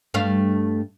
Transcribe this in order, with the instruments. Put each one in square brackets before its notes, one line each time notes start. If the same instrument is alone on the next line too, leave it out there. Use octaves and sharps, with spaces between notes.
[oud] G2 A3 F5